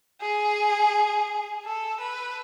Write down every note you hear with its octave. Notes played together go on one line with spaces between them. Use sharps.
G#4
A4
B4